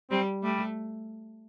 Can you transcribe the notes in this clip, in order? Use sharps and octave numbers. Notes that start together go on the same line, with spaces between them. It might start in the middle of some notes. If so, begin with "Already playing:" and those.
G3 C4
G3 A3